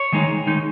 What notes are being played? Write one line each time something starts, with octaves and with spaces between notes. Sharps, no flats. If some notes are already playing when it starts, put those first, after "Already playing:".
Already playing: C#5
D#3 G#3 D#4
D#3 G#3 D#4